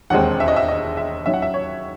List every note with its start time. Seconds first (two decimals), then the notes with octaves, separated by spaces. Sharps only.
0.10 E1 D#2 D#3 G#3 C4 F#5
0.40 E5
0.48 D#5
0.56 E5
0.68 D#5
0.97 E5
1.26 D#2 D#3 F#3 C#4 E5
1.33 F#5
1.42 E5
1.54 C#5